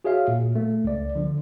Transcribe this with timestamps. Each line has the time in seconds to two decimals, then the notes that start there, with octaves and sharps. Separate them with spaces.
0.04 F#4 G#4 C#5 E5 F5
0.28 A#2
0.55 A3
0.84 C#2 D5
1.16 D3 F3